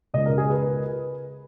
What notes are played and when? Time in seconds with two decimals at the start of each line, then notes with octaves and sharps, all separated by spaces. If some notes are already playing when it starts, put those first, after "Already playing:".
0.13 C#2 C#3 G#3 B3 D#5
0.26 A#4
0.38 G#4
0.50 B4